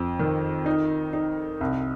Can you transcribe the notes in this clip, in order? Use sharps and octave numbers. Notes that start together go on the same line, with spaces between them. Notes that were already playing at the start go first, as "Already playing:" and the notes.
Already playing: F2
D#3
D#4
D#4
C2